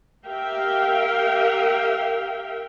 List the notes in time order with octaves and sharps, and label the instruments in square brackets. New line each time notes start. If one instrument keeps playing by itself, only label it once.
[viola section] G4 A#4 E5 F5 G5